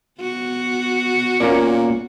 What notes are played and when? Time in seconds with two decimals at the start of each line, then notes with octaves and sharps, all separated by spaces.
0.21 B3 F#4
1.40 A#2 A#3 C#4 D5